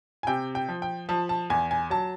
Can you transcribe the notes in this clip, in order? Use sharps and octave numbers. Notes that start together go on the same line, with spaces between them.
G#5
C3 G5
G5
F3
G5
F3 A5
A5
E2 G#5
G#5
F#3 A5